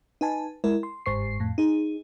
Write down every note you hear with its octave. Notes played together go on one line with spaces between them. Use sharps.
D#4 B4 G#5 A5
G#3 E4 A#4
C6
G1 G#2 C5 C#6 C7
F2 A2
D#4 G#4